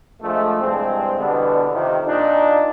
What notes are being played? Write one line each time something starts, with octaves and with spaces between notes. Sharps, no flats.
A#1 F3 G#3 A3
C2 G2 G#3 C4
B2 D3 E3 G3 B3 D4
F2 C3 D#3
A#2 D4 D#4